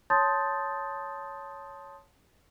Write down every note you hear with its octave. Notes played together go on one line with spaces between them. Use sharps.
C#5 A5 C6 D#6 G6 A6